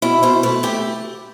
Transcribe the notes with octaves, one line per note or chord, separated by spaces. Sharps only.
B2 E4
B2 C5
A3 B4
A3 G4